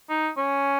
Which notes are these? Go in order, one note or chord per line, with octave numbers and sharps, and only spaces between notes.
D#4
C#4